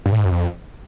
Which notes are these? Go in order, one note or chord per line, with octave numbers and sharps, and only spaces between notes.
G2
A2
G#2
F#2
F2